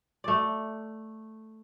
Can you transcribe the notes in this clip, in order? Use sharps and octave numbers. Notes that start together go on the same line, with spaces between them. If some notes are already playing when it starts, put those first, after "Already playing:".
A3 D5